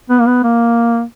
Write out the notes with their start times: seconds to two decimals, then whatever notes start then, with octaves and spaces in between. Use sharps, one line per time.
0.10 B3
0.19 A#3
0.27 B3
0.44 A#3